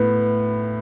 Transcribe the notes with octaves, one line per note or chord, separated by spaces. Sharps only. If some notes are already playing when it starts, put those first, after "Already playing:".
Already playing: A2 B3